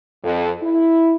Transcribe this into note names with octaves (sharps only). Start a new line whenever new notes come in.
F2
E4